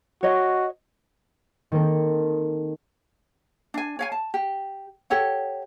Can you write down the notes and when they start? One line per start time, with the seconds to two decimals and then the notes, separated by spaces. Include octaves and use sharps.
0.23 F#4 C#5 D#5
1.72 D#3 A#3 C4 A4
3.74 D4 G#5
3.99 C#5 F5 G#5
4.12 A5
4.34 G4
5.10 G4 A4 C#5 F#5